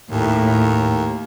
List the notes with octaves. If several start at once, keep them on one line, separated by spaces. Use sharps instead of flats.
D#2 A2